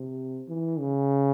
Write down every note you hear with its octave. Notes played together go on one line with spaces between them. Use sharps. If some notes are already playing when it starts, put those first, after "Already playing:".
Already playing: C3
E3
C#3